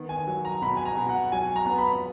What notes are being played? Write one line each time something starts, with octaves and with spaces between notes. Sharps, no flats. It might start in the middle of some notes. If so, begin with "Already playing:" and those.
Already playing: D#3 B3
G#5
F#3
A#5
B2 B5
G#5
A#5
B2
F#5
F#3 G#5
A#5
B3
B5